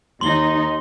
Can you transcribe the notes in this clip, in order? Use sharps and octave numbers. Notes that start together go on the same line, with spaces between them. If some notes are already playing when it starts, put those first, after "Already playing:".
D#2 D#4 C6 G7